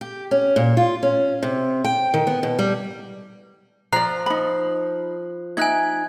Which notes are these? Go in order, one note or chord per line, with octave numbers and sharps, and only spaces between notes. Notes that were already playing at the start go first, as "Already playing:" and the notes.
G4
C#4
A#2
F4
C#4
C3
G5
D#3
B3
B2
G3
F3 D5 A#5 F#6 C7
D#4 B5
D#4 E5 G#5 F#6 G#6